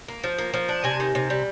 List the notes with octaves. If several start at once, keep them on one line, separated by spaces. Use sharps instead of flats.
A#3
F3
A#3
F3
D4
C3 G#5
D#3
C3
G3